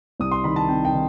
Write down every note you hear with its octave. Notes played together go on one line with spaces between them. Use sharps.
C2 D#6
C6
D#3 B5
A5
C3 G5
G5
D#3